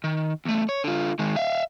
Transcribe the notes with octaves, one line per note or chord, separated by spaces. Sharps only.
D#3
E2 A3
C#5
D3 F4
D#3 G#3
E5 F5